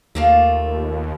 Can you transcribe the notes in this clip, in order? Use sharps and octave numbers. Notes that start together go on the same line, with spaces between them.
D#2 A3 A#3 F4